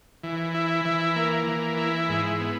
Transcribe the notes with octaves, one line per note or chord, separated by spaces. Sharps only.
E3
E4
E3
A#3
E3
E4
G#2
B3